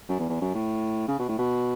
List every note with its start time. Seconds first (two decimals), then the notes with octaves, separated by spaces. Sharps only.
0.09 F#2
0.19 E2
0.29 E2
0.41 F#2
0.55 A2
1.08 C#3
1.19 B2
1.29 A2
1.38 B2